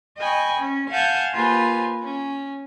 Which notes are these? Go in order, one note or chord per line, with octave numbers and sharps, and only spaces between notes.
D#5 G5 G#5 B5 C#6
C#4
F5 F#5 G#5 A5 F6 G6
A#3 F4 G4 B4 C5 G#5
C#4